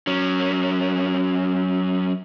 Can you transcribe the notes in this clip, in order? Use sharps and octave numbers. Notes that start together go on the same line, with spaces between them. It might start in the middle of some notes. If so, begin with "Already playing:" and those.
F#3 C#4